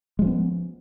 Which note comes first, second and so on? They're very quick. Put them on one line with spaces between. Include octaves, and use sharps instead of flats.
G#3 F3 C#4 B3